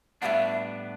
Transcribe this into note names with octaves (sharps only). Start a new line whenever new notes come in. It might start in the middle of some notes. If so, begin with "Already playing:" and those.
A2 G3 B3 D4 E5 F#5